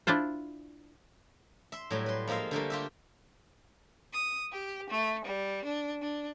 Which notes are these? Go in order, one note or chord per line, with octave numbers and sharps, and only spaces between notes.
D4 E4 F4 C5
E5 C6
A2 F#3 G3
B4 C6
F3 G#3 A#3 E5 F5
D3 G3 A3 A#3
F4 G4 E5
D#6
G4
A3
G3
D4
D4